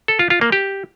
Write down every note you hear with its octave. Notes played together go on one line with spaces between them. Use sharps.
A4
F4
F4
A#3
G4